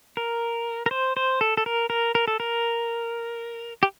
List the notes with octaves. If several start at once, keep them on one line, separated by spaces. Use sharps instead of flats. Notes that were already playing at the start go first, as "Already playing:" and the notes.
A#4
A#4
C5
C5
A4
A4
A#4
A#4
A#4
A4
A#4
G4